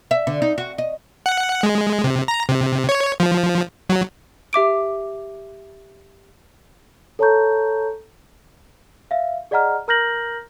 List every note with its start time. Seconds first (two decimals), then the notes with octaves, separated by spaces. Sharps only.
0.11 E5
0.27 D3
0.42 D#4
0.58 F#4
0.78 D#5
1.26 F#5
1.63 G#3
2.04 C3
2.28 A#5
2.49 C3
2.89 C#5
3.20 F3
3.90 F#3
4.53 G4 E5 D6 D7
7.19 A4 C#5 A5 A#5 C#6 G6
9.11 E5 F5
9.51 G#4 D5 D#5 F#5 A#5 F6
9.88 A#4 A#5 F6 G6 A#6 F#7